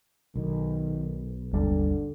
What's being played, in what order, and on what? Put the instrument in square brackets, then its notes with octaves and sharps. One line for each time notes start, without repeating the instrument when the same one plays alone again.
[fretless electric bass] B1 [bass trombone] D#3
[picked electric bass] G#1 D#2 G3 [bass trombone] D3